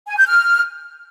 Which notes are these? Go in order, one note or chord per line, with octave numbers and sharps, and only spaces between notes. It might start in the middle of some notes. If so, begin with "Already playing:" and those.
G#5
G6
F6